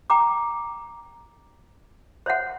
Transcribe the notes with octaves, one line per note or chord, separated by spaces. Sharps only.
G5 A#5 D6
C5 C#5 E5 F#5